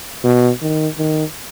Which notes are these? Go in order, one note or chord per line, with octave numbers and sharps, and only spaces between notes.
B2
D#3
D#3